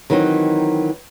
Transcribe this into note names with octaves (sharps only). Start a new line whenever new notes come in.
D#3 E3 F#3 C4 D#4